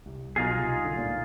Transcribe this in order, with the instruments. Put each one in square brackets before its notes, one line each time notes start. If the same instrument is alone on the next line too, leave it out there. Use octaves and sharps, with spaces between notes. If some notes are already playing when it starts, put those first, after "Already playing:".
[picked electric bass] C2
[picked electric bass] B1 B2 [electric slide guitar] D#4 F4 G#4
[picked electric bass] C2
D3
C#2 A#2